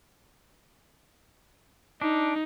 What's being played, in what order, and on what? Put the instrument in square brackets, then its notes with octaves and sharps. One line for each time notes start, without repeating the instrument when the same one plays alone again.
[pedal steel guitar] D4 [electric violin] D#4